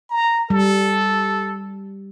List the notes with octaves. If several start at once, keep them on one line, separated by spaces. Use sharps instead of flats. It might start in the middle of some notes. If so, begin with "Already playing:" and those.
A#5
G3 A4